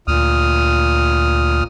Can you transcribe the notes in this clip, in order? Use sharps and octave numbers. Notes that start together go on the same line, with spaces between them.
D2 A#2 D#6 F6